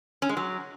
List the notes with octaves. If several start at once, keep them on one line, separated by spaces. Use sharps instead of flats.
C#4
G#3
F#3